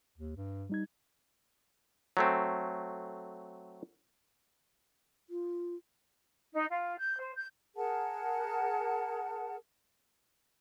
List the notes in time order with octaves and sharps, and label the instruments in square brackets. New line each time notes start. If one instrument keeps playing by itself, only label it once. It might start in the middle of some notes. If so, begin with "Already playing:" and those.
[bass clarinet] D#2
G2
[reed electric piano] G3 D#4 G#6
[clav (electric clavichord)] F#3 A3 C4
[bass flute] F4
[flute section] D#4
F4
G6
C5
G6
G#4 A#4 F#5 A5